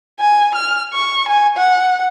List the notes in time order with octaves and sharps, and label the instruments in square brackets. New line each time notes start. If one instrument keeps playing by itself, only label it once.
[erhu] G#5
F6
C#6
G#5
F#5